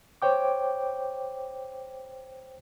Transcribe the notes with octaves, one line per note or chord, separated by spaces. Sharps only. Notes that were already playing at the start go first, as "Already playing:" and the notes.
C5 C#5 G5 D6